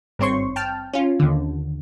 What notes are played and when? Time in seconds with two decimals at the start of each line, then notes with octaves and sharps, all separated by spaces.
0.19 G#1 G2 C4 C#5 C6 C#6
0.56 G5 A5 F6
0.93 C#4 F4
1.20 D#2 D3